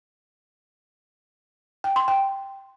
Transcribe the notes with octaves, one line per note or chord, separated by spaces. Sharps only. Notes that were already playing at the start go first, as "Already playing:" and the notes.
G5
C6
G5